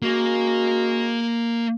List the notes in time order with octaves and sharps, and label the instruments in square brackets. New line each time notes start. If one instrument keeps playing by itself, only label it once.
[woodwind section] G#3 C#4 F#4 [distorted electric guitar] A#3